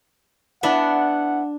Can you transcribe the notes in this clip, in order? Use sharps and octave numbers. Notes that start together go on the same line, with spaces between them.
B3 D4 E4 F#5